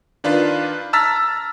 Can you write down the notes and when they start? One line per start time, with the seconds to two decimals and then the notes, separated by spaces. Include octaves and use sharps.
0.24 D#3 D4 F4 B4
0.93 A5 A#5 E6 F6 A6 B6